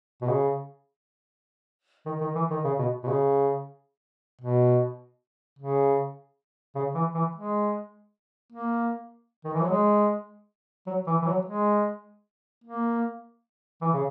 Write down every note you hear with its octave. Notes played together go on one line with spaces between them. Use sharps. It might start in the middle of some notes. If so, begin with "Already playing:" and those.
B2
C#3
D#3
D#3
E3
D#3
C#3
B2
B2
C#3
B2
C#3
C#3
E3
E3
G#3
A#3
D#3
E3
F#3
G#3
F#3
E3
E3
F#3
G#3
A#3
E3
C#3